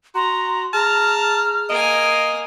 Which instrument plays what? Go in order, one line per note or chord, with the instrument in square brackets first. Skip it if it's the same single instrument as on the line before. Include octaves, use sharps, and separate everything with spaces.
[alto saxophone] F#4 [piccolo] A#5 [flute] C6
[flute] G#4 [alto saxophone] A5 [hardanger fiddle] A#5 [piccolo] F6
[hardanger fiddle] A#3 G#5 [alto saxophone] D#5 [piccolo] D7